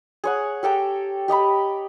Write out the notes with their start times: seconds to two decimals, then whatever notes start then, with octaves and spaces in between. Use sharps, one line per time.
0.24 G#4 C#5 F#5
0.63 G4 A4 G5 A#5
1.28 G4 D#5 A#5 B5